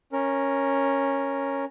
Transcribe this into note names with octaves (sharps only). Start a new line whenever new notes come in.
C#4 A#4